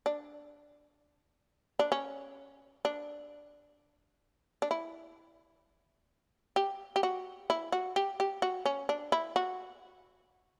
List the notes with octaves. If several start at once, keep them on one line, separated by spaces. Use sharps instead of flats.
D4
D4
C#4
D4
D4
E4
G4
G4
F#4
E4
F#4
G4
G4
F#4
C#4
D4
E4
F#4